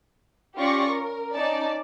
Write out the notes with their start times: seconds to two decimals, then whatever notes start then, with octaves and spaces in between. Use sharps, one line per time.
0.58 C#4 F4 G4 D5 C#6 A#6
0.89 A#4
1.35 C#4 D#4 D5 A5